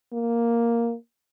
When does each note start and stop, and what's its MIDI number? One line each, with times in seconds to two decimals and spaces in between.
0.13 0.95 58